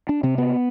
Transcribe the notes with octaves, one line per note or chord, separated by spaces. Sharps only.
D4
C3 C4
B3